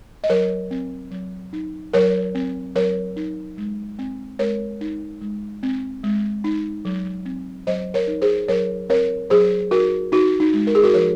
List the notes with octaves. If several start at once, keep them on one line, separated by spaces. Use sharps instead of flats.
D#5
F#3 A#4 C#5
C4
F#3
D#4
F#3 A#4 C#5
C4
F#3 A#4 C#5
D#4
G#3
C4
G#3 A#4 C#5
D#4
G#3
C4
G#3
D#4
F#3
C4
F#3 C5 D#5
A#4 C#5
D#4
G#4 C5
F#3 A#4 C#5
C4 A#4 C#5
F#3 G#4 C5
D#4 F#4 A#4
D#4 F#4
D#4
G#3
A#4
G#4
F#4 A#4
F3 A#4 C#5